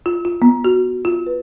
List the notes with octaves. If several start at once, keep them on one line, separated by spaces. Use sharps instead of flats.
F4
F4
B3
F#4
F4
B4